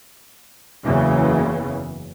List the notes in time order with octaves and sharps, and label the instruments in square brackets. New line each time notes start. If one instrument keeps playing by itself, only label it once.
[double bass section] F#1 E2 C#3 E3